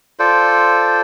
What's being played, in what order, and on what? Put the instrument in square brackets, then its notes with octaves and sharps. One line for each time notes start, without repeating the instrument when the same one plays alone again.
[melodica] F4 A4 C5 D5